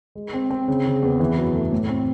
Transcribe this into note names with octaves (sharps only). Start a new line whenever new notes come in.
G#3
C4
C4
C#3
C#3
E2
E3
F#2
A3
A2
C4